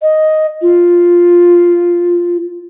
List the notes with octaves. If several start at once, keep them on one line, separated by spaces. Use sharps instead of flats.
D#5
F4